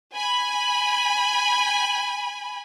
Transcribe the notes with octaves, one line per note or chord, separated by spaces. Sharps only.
G#5 B5